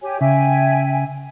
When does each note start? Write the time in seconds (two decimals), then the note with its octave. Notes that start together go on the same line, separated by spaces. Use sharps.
0.02 G4 C#5 G#5
0.21 C#3 E5 G5 G#5